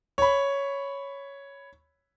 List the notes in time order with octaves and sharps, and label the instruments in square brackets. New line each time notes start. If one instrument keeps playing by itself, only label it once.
[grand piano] C#5 B5